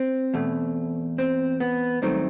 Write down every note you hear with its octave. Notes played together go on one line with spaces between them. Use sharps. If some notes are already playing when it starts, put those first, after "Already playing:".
Already playing: C4
E2 B2 A3
C4
B3
G2 D#3 F#3 A3 C4